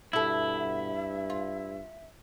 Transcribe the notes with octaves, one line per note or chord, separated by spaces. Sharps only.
G2 B2 E4 A4 E5
F4